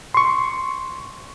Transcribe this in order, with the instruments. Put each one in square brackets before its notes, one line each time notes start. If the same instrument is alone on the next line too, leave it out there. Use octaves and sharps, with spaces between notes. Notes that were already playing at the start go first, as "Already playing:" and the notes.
[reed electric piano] C6 C#6